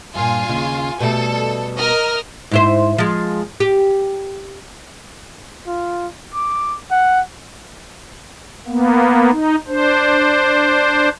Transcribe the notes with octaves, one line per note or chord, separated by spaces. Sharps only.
G2 A#2 F4 G#5
D#2 C#3
B2 G3 A3 A4
A#4 D#5 F6
G#2 E4 C5
F3 G#3
G4
F4
D6
F#5
A#3 B3
D#4
D4 C5